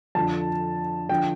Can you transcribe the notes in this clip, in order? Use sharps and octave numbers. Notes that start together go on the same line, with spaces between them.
F2 D3 F3 A5
D3 F3 G5